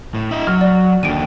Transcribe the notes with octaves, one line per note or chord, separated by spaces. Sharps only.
A2
E4 D#5
F#3 F6
D5
D#2 D3 D7 D#7